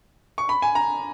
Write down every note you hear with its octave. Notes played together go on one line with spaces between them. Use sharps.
C#6
B5
G#5
A#5